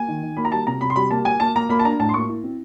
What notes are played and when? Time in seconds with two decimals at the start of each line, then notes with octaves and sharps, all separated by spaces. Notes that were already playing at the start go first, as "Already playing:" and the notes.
Already playing: A#3 G#5
0.08 D#3
0.23 D#3
0.37 A#3 B5
0.45 A#5
0.52 G3 A5
0.67 C3 A#5
0.81 C3 B5
0.90 C6
0.96 G3 B5
1.11 A#3 A5
1.25 A#3 G#5
1.40 A#3 A5
1.56 A#3 A#5
1.69 A#3 B5
1.79 A5
1.84 D4 A#5
1.99 A2 A5
2.09 C6
2.14 A#3 C#6
2.28 E4
2.44 C4